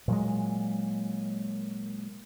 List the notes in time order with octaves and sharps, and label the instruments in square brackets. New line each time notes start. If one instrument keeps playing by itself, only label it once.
[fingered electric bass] A#2 F#3 G#3